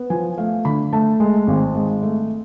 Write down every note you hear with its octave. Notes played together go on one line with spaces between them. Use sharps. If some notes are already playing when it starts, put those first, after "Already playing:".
Already playing: B3
F3 G#5
A3 F5
D3 B5
A3 A5
G#3
G#1
G#3
A3